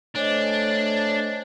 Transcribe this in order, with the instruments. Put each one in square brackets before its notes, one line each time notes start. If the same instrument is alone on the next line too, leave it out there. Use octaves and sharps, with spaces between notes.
[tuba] A3 [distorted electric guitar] D4 [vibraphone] C5 D#5 G#5 [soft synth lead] C#5